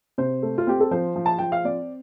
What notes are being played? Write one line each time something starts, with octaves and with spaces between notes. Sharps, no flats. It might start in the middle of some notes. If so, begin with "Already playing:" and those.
C3 C5
A3
F4
C4 G4
A4
F3 C5
F3
A5
F3 G5
F5
C4 D5